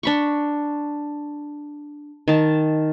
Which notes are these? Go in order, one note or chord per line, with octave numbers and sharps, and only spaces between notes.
D4 B5 C#6
D#3 A5